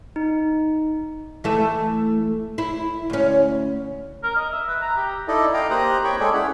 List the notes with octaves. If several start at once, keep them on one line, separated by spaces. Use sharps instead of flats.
D#4
E3 A3 E5
E4
D2 C#4
A#4
D#5
E5
B4
A#5
G4
D#4 E4 A4 D5 D#5
D#5 F5 G5 A#5
A#3 G4 C5 A#5 D#6 F#6
C5 C#5 G5 B5 C#6
G#3 G#4 A4 C#5 D5 G5
C#4 E4 F#5 B5